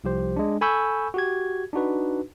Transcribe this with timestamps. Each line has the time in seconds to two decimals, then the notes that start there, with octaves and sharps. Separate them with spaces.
0.04 C2 F3 G4 C5
0.36 G#3 D4
0.61 A4 G#5 B5 C#6 E6 G6
1.14 F#4 G4 G#6
1.73 D4 D#4 F#4 B4